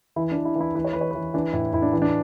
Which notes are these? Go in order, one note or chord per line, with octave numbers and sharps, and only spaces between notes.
E3 E4
D4
E3
E4
E3
E4
E3 B4
C#5
E3 B4
C#5
B4
E3
E3 D4
A2 E4
A2 E4
D4
E3
D4